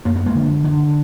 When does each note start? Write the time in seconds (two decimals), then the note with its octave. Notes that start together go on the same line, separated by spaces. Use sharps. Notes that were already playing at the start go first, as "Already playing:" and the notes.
0.05 F#2 A#3
0.16 B3
0.26 G#3 A#3
0.35 D3
0.64 D3